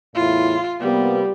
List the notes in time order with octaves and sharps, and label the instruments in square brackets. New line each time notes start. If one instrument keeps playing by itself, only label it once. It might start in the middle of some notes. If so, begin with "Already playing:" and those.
[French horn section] E2 A2 E4 [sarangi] F4
[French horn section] C3 A#3 B3 [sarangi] G3